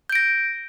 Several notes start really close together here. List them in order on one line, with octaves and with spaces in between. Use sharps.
G6 D7 A#6